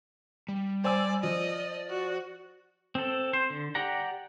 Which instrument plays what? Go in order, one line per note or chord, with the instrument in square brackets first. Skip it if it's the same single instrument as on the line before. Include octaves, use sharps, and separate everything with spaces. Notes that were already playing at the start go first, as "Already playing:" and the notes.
[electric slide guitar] G3
[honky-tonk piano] C5 G#5 E6 [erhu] D5
[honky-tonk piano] F3 [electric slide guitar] D5 [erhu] D#5
[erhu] F#4
[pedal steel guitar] C4 A4
C5
D3
G4 D5 F#5 A#5